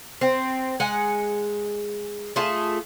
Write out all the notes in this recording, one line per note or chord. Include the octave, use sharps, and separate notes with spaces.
C4
G#3 F#5 G#5
A3 F4 G#4 A5